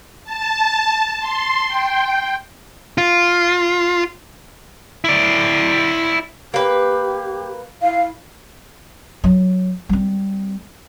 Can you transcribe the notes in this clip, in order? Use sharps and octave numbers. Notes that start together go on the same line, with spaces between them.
A5
C6
G5
F4
E4 D5
A#3 G4 B4
E4 F5
F#3
G3 C4